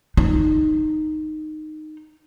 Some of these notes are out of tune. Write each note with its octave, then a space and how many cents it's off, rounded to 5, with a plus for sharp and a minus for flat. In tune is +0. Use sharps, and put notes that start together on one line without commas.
D#4 -10